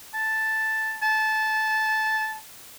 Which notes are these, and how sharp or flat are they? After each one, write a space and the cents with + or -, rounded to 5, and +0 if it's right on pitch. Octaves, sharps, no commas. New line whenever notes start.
A5 +0
A5 -15